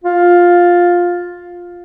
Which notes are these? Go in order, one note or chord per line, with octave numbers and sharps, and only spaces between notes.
F4